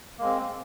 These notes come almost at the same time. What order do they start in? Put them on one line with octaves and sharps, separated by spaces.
A#3 G#3 C4